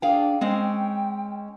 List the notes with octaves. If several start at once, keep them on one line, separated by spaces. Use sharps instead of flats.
D4 G#4 F5 G5
G#3 C4 C#4 G5